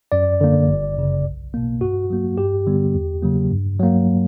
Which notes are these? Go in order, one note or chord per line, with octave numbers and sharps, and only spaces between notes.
F#2 D5
D3 A#3
G1
F#2 C#3
B1
B2 A#3
G2 F#4
F#3 A#3
G2 G4
D3 G3 B3
E2
C#3 F#3 A#3
G2
F#3 A#3